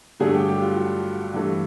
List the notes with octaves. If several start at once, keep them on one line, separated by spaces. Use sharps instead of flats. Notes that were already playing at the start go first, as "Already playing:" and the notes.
G2 D3 F#3 A3 G#4
G4
G4
F4
F#4
G2 E3 A3